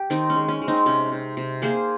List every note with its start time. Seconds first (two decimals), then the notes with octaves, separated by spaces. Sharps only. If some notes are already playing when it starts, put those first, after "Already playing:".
Already playing: G4
0.10 D#3 C4 D#4
0.30 C#4
0.36 G#3
0.48 C#4
0.62 G#3
0.68 C4 D#4
0.86 C3 C#4
1.12 C3
1.37 C3
1.62 A#3 G#4 C5